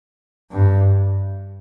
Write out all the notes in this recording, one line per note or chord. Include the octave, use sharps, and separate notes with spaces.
G2